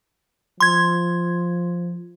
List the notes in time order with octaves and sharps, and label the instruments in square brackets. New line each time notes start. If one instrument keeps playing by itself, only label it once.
[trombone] F3 [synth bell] C6 G#6